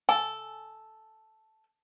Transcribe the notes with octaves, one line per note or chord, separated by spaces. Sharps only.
A4 G#5